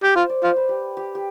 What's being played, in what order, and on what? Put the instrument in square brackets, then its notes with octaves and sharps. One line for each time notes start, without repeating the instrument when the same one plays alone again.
[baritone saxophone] G4
[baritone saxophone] F4 [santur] C5
[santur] D5
[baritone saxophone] F4 [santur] C5
[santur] B4
G4
G4
G4